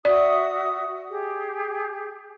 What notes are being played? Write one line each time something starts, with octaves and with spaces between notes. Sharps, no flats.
F#4 D5 E5 D#6
G4 G#4